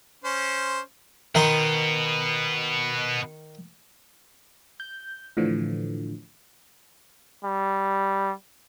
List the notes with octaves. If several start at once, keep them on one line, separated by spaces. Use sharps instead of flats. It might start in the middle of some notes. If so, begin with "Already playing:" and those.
C#4 C5
B2 D#3 B3 D#4 C6
G6
A2 D3 E3 F3
G3